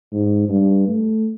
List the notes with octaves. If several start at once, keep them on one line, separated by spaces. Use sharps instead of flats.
G#2
G2
A3